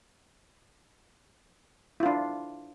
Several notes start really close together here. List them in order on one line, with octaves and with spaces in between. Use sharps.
E4 F4 D4